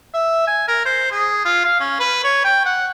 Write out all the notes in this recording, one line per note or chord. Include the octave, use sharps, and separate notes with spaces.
E5
G#5
A#4
C5
G#4
F4
F5
C#4
B4
C#5
G5
F#5